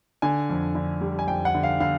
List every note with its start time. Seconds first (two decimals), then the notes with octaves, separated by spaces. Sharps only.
0.22 D3 G#5
0.50 F2
0.75 D3
1.01 G3
1.19 G#5
1.28 F2 G5
1.45 F#5
1.55 D3
1.63 F5
1.80 D3 F5